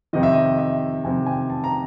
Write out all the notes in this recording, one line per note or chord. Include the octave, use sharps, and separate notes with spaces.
F2 C3 D#3 D#5
E5
D#5
E5
F2 C3 D#3 G#5
G#5
A5
A#5